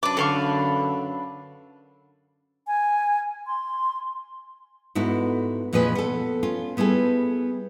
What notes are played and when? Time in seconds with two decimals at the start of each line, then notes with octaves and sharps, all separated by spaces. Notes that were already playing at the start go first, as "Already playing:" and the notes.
0.03 F#2 D4 B4 D6
0.17 D3 A4 F5 C#6
2.67 G#5
3.47 C6
4.95 G#2 B3 E4 F#4 A4
5.73 F2 A#2 F3 G#4 B4 D#5
5.95 B3 A4
6.43 C#4 F4
6.77 G3 B3 E4 G#4 A4